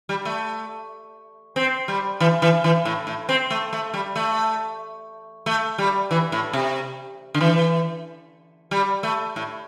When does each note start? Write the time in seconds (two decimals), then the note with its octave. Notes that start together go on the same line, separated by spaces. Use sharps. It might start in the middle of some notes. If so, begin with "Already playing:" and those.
0.09 G3
0.25 A3
1.56 C4
1.88 G3
2.20 E3
2.42 E3
2.64 E3
2.85 A2
3.07 A2
3.29 C4
3.50 A3
3.73 A3
3.94 G3
4.16 A3
5.46 A3
5.78 G3
6.11 E3
6.32 A2
6.53 C3
7.34 D3
7.41 E3
8.71 G3
9.03 A3
9.36 A2